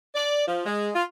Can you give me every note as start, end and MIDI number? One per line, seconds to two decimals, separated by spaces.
0.15 0.44 74
0.47 0.65 53
0.66 0.90 56
0.95 1.04 65